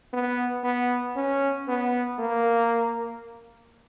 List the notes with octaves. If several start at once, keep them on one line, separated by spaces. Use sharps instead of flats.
B3
B3
C#4
B3
A#3